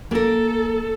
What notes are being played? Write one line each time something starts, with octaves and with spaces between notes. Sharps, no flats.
A#3 A4 A#4